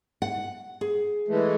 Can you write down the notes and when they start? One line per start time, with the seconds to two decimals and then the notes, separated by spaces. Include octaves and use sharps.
0.22 F#5
0.81 G#4
1.28 E3 G#3 A3